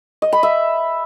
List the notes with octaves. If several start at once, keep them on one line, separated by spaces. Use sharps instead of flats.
D#5
B5
E5